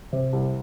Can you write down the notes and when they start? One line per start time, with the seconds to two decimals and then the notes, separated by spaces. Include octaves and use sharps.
0.13 C3
0.33 C2